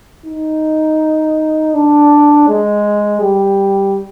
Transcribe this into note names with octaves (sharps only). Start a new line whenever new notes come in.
D#4
D4
G#3
G3